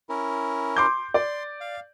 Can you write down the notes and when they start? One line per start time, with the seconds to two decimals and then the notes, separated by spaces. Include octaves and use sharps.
0.09 C#4 E4 A#4
0.77 C6 D6 G6
1.14 D5 C6
1.61 F5